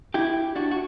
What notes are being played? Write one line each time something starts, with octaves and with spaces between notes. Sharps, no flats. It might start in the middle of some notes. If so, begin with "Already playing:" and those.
E4 G4
D4 F#4
F#4